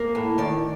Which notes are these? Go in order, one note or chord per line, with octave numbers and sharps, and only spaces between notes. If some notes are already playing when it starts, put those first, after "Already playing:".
Already playing: A#3
A2
D#3 D5